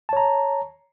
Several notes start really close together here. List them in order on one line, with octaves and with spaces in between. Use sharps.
A5 C#5 A#5